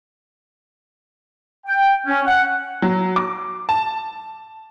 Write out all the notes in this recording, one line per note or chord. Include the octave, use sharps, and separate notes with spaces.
G5
C#4
F#5
F#3
D6
A5